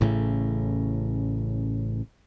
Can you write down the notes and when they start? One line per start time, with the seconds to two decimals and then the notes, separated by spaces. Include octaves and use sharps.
0.01 A1 A2 C#3 A3